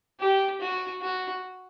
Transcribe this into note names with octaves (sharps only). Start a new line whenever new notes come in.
G4
F#4
F#4